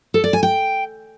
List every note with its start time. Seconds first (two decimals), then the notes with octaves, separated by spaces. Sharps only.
0.14 A4
0.24 D5
0.33 G#5
0.43 G5